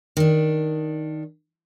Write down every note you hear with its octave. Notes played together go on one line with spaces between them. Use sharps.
D#3 D4